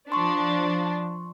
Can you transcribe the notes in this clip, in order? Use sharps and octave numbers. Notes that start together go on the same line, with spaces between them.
F3 D4 C6 C#6